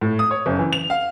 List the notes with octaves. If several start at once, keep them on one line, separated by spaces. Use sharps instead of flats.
A2
D#6
C#5
F#1
E3
F7
F5